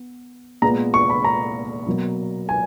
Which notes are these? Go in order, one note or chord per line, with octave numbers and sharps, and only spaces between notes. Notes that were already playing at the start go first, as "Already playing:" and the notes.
Already playing: B3
A#2 G#3 B3 A#5
C#6
B5
A#5
B2 F#3 A#3
G#5